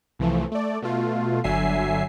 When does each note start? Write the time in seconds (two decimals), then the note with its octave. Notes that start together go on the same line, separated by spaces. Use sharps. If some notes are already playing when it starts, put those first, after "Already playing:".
0.19 C2 E3 F3 A3
0.52 A3 D5
0.82 B2 A3 F4
1.44 G1 D3 F#3 E5 G#5 C7